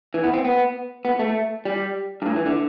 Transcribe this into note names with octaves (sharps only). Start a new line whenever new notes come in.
E3
B3
C4
B3
B3
A3
G3
G2
A2
E3
D3